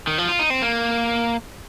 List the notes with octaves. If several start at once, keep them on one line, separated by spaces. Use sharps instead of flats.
D#3
F3
F4
D#4
C4
A#3